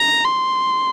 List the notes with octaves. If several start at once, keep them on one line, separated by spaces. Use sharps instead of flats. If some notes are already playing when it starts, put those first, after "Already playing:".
Already playing: A#5
C6